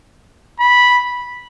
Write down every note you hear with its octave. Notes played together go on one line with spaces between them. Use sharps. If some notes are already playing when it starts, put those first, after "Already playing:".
B5